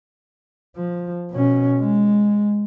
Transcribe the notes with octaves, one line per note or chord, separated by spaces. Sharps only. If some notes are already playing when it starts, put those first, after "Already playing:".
F3
B2 C#4
G#3